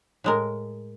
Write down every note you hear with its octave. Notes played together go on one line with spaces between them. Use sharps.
A2 G#3 A#4